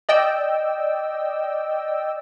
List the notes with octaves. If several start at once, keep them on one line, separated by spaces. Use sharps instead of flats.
D5 D#5 G5 E6